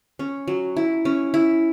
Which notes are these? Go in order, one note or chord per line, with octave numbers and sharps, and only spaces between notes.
C#4
F#3
E4
C#4
E4